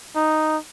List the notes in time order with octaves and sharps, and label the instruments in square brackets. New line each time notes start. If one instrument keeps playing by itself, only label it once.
[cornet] D#4